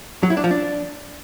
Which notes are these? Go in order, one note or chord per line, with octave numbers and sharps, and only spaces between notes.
F#3
E4
D4
F3
D4